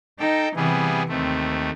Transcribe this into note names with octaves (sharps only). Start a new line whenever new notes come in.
D#4 A4 G5
C3 E3 G3 B3 G#4
D#2 A3 C4